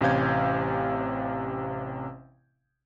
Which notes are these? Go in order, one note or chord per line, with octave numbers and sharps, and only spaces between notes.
A1 C3 C#4 F5 G6 G#6